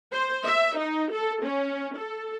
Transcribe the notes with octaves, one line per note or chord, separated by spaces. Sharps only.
C5
E5
D#4
A4
C#4
A4